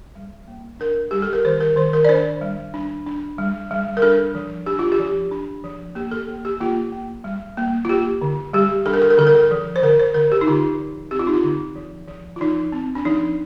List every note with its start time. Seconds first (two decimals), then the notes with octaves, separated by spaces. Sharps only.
0.15 G3
0.48 A#3
0.80 D4 A#4
1.11 G3 G4
1.22 A4
1.33 A#4
1.45 D#3 C5
1.60 A#4
1.76 D#3 C5
1.93 A#4
2.05 D5
2.09 D4 C5
2.41 G3
2.74 D4
3.06 D4
3.38 G3
3.71 G3
3.97 A#4
4.02 D4 A4
4.35 F3
4.66 D4 G4
4.79 F4
4.92 G4
4.99 F3
5.31 D4
5.64 F3
5.95 A#3 G4
6.11 A4
6.28 A#3
6.45 G4
6.60 A#3 F4
6.92 A#3
7.24 G3
7.57 A#3
7.85 F4
7.89 A#3 G4
8.21 D3
8.53 G3 G4
8.86 D4 A4
8.94 A#4
9.02 A4
9.10 A#4
9.18 D3 A4
9.27 A#4
9.35 A4
9.51 F3
9.76 C5
9.83 D3 A#4
9.99 C5
10.14 D3 A#4
10.32 G4
10.41 D#4
10.47 D3 F4
10.79 F3
11.11 C4 G4
11.19 F4
11.27 D#4
11.34 F4
11.43 D3
11.76 F3
12.08 F3
12.36 F4
12.41 F3 D#4
12.72 C4
12.95 D4
13.05 F3 D#4